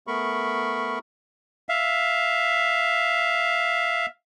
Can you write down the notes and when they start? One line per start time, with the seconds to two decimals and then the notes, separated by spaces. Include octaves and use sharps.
0.07 A3 B3 A#4 B5 C#6
1.69 E5 F5